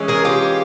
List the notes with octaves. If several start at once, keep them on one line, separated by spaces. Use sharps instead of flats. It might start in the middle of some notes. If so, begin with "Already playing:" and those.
Already playing: E3 G#3 C#4
G#4 A#4
F4 G4